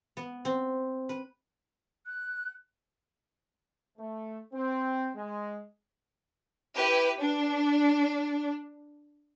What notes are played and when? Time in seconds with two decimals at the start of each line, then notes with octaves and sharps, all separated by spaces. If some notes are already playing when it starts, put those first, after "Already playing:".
0.17 B3
0.45 C4
1.09 B4
2.07 F#6
3.98 A3
4.53 C4
5.14 G#3
6.77 E4 G4 B4
7.18 D4